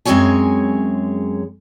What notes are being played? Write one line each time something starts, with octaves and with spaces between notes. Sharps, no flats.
F#2 G#3 C4 G#4 C#5 G#5